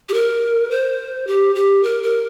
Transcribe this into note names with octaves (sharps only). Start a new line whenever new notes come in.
G4
A#4
C5
G4
G4
A#4
A#4